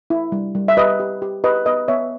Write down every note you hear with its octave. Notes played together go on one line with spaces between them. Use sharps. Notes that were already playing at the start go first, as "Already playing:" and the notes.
E4
G3
G3
E5
G4 B4 D#5
G4
G4
G4 B4 D#5
B3 B4 D#5
B3 C#5 E5